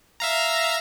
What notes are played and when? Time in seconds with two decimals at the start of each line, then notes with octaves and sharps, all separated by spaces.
0.20 E5 F5 A#5